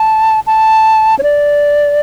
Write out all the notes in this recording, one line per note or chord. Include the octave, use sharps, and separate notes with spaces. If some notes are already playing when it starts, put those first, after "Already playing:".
Already playing: A5
A5
C#5
D5